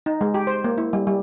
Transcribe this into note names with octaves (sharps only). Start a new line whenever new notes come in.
D#4
G#3
G4
C5
A#3
E4
G3
G3